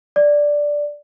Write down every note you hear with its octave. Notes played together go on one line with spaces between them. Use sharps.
D5